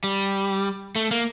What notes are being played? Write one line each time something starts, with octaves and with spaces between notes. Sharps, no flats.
G3
A3
A#3